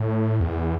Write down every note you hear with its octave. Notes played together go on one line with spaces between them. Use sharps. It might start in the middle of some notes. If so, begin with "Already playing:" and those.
Already playing: A2
E2